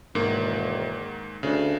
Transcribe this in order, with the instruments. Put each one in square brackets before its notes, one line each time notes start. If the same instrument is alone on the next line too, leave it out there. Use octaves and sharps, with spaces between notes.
[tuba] E1 [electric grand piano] G#2 D#3 A#3
[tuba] D2 [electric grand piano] C#3 D4